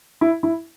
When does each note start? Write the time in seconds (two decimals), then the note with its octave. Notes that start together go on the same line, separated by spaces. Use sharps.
0.21 E4
0.43 E4